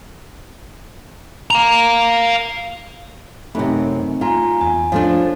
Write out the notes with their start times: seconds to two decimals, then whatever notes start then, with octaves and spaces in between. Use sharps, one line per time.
1.51 F5 A#5
3.55 F#2 C3 A3 C4 D#4 B5
4.21 F4 F5 G#5 A#5
4.61 E2 G#5
4.92 F3 A3 D4 C#5 F5